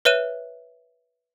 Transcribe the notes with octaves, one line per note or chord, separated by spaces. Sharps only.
B4 C#5 E5 F#6 D#7 E7